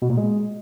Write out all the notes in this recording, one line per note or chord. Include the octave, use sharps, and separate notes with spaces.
B2
A#2
G#3